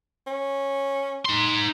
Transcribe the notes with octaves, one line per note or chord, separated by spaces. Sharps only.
C#4
D#4 C6